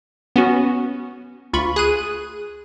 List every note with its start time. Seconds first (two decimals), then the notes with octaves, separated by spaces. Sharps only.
0.36 B3 C#4 F#4
1.53 D2 F4 B5 C#6
1.76 G#4 F#6 D#7